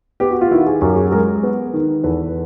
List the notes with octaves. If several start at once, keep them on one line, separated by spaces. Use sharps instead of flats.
B3 G4
F#4
F4
D#3 E4 F#4
G#4
F#2 G4
F#4 G#4
G#3 G#4 A#4
B3
D#3
E2 A4 B4